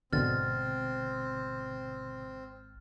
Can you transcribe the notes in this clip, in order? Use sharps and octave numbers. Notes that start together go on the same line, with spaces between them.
G#1 B2 D3 C4 F6 A6